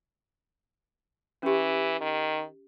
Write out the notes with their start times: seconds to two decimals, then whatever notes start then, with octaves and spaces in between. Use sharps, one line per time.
1.43 E3 C#4 G4
2.00 D#3